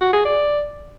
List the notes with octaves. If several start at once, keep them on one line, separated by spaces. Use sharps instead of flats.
F#4
G#4
D5